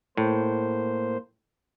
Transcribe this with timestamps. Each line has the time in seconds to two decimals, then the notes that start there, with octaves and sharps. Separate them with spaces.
0.17 A2 A#3 C5